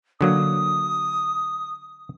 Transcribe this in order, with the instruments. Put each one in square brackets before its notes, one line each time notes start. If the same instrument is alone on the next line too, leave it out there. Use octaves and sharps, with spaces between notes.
[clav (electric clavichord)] D3 F#3 A#3 [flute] D#6